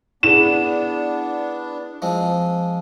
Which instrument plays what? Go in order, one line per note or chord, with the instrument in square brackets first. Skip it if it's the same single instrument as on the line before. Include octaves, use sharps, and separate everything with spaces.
[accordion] B3 D4 [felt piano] E4 G#4 [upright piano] E7
[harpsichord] F3 G#3 C4